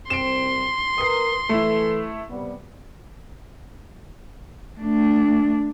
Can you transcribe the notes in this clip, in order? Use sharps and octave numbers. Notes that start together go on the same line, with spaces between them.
C2 C4 C6 D7 E7
A#4 B4 D#6 C7
E3 A3 E4 A4
C3 G3 B3
A3 D4